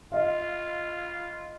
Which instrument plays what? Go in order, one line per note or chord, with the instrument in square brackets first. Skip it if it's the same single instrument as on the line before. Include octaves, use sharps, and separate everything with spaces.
[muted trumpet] F4 [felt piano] D#5 F5